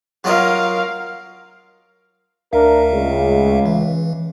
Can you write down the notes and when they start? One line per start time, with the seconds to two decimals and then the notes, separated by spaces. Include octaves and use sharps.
0.24 F#3 F4 A#4 D#5 F5
2.53 D2 D4 A#4 E5 F5
2.91 C#2
3.66 E3